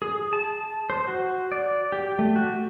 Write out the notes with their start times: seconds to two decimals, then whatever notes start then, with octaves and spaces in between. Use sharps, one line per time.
0.02 G#4
0.33 A5
0.90 C5
1.07 F#4
1.52 D5
1.92 G4
2.19 A3
2.36 F#4